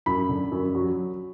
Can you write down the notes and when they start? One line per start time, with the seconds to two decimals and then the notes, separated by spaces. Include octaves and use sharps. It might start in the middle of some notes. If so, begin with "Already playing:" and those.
0.06 F#2 B5
0.29 D3
0.51 F#2
0.75 F#3